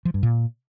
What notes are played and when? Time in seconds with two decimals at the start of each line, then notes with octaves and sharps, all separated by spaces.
0.05 F3
0.14 G2
0.23 A#2